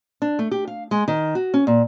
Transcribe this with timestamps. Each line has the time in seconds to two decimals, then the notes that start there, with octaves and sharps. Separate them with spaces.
0.22 D4
0.39 A3
0.51 G4
0.67 F5
0.91 G#3
1.08 D#3
1.35 F#4
1.54 C#4
1.67 A#2